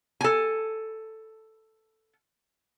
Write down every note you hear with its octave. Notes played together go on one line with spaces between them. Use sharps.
A4 G#5